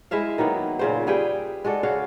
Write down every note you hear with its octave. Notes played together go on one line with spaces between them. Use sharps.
G#3 E4 E5 F5
D#3 F#3 A#3 B3
A#2 C#3 C5
G3 G#4 B4 G5
G#3 F#4 A4 D5
C#3 F#4 F5